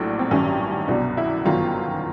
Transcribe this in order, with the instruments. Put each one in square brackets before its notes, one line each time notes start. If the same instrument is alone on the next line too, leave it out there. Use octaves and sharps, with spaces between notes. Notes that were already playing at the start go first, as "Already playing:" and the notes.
Already playing: [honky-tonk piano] A#1 A2 F#3 D4
C4
A1 G2 D#3 F#3 C#4
C2 B2 F#3 D4
E4
G1 F#2 D#3 F#3 F4